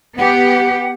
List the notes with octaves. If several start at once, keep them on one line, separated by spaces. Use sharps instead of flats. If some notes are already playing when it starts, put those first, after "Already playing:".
B3 G4 F#5